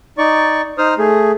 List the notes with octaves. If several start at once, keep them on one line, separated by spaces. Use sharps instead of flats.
D#4 D5 C#6
D#4 C5 D#6 F6
A3 G#4